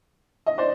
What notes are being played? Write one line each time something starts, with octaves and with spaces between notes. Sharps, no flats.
D#5
C5 D5